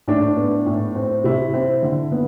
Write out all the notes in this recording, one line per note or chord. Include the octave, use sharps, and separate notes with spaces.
A2 D4
B3
A2
C4
C3 E4
C4
D3
B3